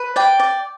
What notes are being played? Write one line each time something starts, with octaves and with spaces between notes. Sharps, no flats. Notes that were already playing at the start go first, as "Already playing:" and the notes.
Already playing: B4
D5 G5
D5